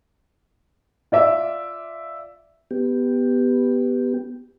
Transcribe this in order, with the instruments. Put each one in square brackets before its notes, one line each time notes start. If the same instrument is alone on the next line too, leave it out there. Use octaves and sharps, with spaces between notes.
[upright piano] F4 D5 E5
[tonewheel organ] B3 G4